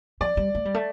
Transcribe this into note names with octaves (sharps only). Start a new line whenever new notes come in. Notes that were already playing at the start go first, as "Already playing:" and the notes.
F3 D5
G3
A3
G3
A3